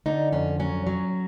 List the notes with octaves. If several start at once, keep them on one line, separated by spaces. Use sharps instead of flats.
D3 D#4
F2 C#4
F#3 C#4
F#3